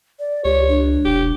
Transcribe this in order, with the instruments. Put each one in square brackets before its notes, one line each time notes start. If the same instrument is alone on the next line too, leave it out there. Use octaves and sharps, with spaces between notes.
[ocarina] D5
[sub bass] C#2 [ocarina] G4 [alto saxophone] C#5
[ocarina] D4
[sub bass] E1 [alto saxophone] G4